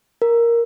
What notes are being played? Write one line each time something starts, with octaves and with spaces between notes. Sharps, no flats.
A#4